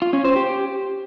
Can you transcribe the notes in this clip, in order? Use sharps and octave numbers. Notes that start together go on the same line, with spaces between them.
F4
C#4
C5
G4